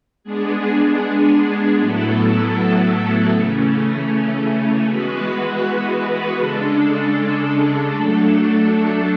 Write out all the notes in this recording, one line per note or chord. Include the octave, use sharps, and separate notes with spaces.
G#3 B3 D4 G#4
A2 F#3 B3 E4 A4
C#3 E3 A3 C#4
E3 G#3 B3 F#4 B4
C#3 G#3 D4 A4
F#3 A3 D4 A4